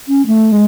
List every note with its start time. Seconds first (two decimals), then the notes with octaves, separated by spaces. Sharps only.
0.08 C#4
0.27 A3
0.52 G#3